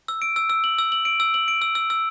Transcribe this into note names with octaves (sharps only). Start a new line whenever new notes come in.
E6
D7
E6
E6
F#7
E6
F#7
D7
E6
F#7
D7
E6
E6
E6